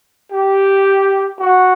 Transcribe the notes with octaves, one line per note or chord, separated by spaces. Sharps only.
G4
F#4